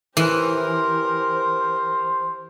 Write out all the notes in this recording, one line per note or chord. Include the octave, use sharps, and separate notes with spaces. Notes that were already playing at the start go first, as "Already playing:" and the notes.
E3 G4 A#4 C5